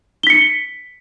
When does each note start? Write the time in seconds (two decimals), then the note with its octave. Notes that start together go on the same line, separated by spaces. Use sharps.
0.23 G7
0.27 B6
0.30 C#7